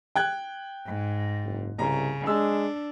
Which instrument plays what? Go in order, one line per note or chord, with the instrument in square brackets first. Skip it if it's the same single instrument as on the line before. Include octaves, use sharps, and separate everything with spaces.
[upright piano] G5 F#6 G#6
[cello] G#2
[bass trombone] F#1
[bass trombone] C2 [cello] C#3 [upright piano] A#5
[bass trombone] G#3 [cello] D4 [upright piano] E6